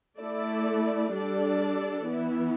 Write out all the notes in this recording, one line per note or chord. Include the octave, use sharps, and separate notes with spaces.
A3 E4 A4 D5
G3 D4 A4 D5
E3 B3 E4